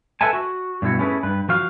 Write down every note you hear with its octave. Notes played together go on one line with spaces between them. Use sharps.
A4 B4 E5 F#5 G#5 A5
F#4
G2 B2 B3 E4 F#4
A3 C#4 E4 G#4 B4
G2 B4
F3 F#4 F5